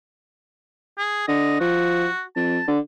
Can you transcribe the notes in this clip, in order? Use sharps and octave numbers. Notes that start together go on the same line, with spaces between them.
G#4
D3 D#5
F3 F#4
F2 A5
D3